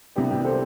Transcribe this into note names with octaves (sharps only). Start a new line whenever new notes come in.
C2 C3 G3 B3 D4 G4
G4
A4 C5